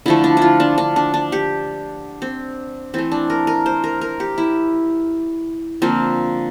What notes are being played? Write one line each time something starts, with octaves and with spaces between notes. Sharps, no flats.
D3 F3 A3 E4
D4
E4 F4
D4
D4
D4
D4
G4
C4
E3 A3 C4
D4
A#4
A#4
C5
A#4
A#4
G4
E4
D3 F3 A#3 C4